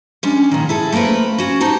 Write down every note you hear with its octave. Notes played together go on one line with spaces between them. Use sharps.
G3 G#3 C#4 D4
A#2 D#3
E4 G#4 A4
A3 A#3 C4 A#4 B4
C#4 F#4
D#4 G4 C5 A5